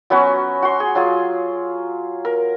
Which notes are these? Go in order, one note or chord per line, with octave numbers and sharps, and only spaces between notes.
F#3 B3 C#4 F#4
F#4 C6
G#4
F#3 F4 G#4
A#4